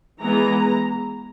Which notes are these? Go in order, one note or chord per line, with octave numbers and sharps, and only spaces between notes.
E3 G#3 B3 A#5